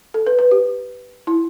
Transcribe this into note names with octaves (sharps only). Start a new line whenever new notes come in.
A4
B4
B4
G4
E4